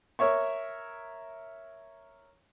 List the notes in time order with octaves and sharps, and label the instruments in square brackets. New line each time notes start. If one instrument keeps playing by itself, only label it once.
[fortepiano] A#4 C#5 E5 C#6